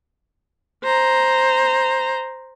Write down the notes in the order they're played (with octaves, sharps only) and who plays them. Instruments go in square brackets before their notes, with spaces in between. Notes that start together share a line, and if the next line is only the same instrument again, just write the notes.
[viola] C5 A#5